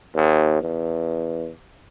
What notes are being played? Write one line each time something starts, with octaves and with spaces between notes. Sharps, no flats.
D#2
E2